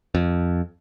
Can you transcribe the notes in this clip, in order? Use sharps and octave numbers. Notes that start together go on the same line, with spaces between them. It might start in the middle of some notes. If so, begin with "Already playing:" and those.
F2